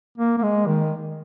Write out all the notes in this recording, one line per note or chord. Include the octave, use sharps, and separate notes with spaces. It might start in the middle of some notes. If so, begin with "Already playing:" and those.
A#3
A#3
G#3
D#3